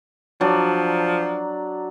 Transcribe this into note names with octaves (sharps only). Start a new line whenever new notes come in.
F3 F#3 D4 D5